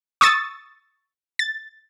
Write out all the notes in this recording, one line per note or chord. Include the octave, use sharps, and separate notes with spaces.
C#6 D#6 E6 A6
A6